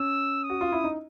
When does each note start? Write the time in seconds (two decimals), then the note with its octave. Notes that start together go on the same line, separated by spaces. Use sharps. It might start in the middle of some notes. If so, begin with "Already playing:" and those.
Already playing: C#4 E6
0.44 D#6
0.50 F#4
0.61 F4
0.72 E4
0.84 D#4